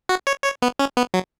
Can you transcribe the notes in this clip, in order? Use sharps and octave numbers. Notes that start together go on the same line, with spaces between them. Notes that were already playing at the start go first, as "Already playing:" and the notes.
F#4
C#5
C#5
B3
C#4
B3
F#3